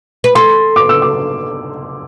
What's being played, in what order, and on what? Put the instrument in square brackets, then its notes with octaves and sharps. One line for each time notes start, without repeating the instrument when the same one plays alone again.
[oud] B4
[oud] A4 [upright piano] C6
[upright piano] D6
E6
D6